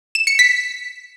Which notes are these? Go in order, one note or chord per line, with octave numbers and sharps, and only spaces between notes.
E7
C#7
B6